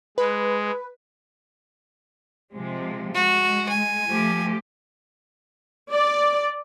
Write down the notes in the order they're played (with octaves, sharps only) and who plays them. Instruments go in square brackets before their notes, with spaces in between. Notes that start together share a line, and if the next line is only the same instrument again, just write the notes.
[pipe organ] G#3 [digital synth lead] B4
[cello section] C3 F3 G#3
[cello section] G#3 [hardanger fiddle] F#4
[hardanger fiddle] G#5
[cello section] F3 A3 G4
[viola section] D5